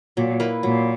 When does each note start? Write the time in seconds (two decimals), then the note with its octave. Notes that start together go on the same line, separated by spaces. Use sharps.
0.17 A#2 F#3
0.40 A#3 E4 B4
0.63 A#2 F#3